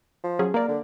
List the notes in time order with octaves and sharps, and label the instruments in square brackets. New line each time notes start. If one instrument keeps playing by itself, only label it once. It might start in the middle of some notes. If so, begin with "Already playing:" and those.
[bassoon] F3
[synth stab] F#3 C#4 G#4
[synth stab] A#3 D5 [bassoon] A#4
[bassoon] D3